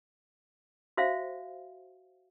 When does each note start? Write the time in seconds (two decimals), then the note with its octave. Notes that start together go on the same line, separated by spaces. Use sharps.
0.97 F#4 C5 E5 F5